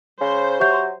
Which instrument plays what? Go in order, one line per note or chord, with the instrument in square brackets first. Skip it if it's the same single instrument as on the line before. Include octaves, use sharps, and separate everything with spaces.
[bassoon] C#3 [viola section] C5
[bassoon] F#3 [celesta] G4 E5 G6 [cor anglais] C#5